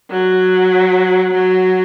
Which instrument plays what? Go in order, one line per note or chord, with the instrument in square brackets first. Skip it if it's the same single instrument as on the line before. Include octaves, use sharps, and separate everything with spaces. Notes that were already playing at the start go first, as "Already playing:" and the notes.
[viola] F#3
F#3